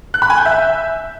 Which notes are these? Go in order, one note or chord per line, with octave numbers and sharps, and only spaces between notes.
F#6
B5
G#5
G6
E5